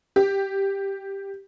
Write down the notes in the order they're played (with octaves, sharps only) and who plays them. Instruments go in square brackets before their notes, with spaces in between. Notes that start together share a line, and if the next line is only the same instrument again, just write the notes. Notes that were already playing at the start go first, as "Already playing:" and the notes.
[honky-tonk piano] G4